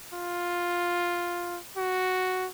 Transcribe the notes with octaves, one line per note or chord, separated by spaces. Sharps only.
F4
F#4